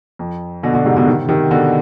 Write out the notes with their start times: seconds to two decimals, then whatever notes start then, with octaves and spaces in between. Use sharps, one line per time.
0.19 F2
0.63 B2 D3
0.74 B2 D3
0.85 G#2 C3
0.97 B2 D3
1.07 C3 D#3
1.29 C3 D#3
1.51 B2 D3